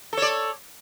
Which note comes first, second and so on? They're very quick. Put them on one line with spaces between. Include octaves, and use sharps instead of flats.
A4 C#5 D5